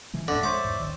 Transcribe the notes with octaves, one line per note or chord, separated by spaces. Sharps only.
B2 E3 G#3
F#1 E2 A2 D3 D5 E5
G#3 C5 C#5 D6 D#6
E2 G#2
D1 A1 D#3